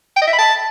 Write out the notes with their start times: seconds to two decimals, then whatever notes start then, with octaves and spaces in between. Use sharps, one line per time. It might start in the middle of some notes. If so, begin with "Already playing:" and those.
0.16 G5
0.22 D#5
0.27 E5
0.33 B5
0.38 A5